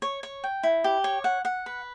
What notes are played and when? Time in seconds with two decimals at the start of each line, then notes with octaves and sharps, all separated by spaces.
0.02 C#5
0.23 C#5
0.44 G5
0.63 E4
0.84 G4
1.04 C#5
1.24 F#5
1.45 F#5
1.66 B4